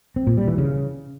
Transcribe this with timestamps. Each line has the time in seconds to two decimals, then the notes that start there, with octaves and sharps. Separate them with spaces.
0.16 C4
0.27 A#2
0.37 G3
0.48 E3
0.58 C#3